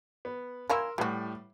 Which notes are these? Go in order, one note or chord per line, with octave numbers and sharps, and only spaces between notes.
B3
A#3 C#4 E4 A#4 C6 E6
A2 E3 G3 F#4